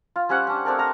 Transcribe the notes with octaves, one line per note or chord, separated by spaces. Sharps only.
F4
G3 C#4 C5 F#5
C#4 D4
A3 C4 D4 A#4
A#4 A5 A#5